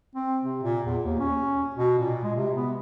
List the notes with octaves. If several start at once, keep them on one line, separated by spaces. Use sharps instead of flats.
C4
C3
A#2
E2
D#2
C#4
B2
A#2
G#3
C3
B3